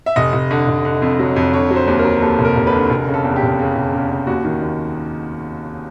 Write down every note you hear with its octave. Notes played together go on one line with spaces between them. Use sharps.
E5
F1 D#5
F1
D3
F1
D3
F2
F#3
F2
D3 C#5
F#3
C5
D#2
A#4
F#3
D#2 A4
F1
A#4
F1
B4
D3
F1 A#4
C#3
A4
E2
G4
F1
C#3
F1
C#3
C#3
D#2 F#4
D#3
D#2